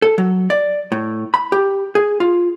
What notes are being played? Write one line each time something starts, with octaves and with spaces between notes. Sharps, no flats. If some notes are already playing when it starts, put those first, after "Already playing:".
A4
F#3
D5
A2
B5
G4
G#4
F4